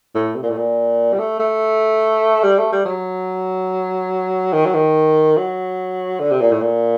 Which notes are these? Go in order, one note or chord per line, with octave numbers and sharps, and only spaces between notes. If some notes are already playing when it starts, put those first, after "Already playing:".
A2
C3
A#2
A2
A#2
G3
A3
A3
G3
A3
G3
F#3
D#3
F#3
D#3
F#3
D3
C3
A#2
A2
A#2